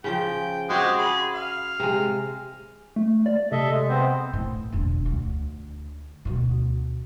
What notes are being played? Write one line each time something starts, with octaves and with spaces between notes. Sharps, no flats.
C#3 F3 G5
G#3 C4 F#4 G4
G#4 B5
F5
C3 G#3
A3
D5
C3 A4 D#5 E5
G#3
B3 C4 C5
A2
E1 D3
D2
D2 B2